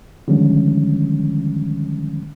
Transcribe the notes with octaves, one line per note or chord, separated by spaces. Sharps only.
D3 D#3 F3 G3 G#3 C#4